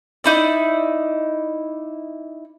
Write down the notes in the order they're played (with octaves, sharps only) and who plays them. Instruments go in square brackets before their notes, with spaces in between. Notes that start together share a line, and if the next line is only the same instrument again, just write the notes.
[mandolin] D#4 E4 D5